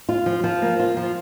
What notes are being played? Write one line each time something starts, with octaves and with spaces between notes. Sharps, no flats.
F4
F3
F3
A#3
F4
F3